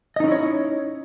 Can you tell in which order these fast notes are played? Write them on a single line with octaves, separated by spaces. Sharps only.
D#5 D#4 C#4 E4 C#5